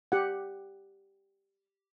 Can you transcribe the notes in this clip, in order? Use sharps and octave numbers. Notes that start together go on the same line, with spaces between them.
G4 F#5